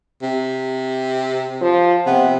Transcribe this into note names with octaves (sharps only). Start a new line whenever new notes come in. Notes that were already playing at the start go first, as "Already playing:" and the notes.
C3
F3
C3 B3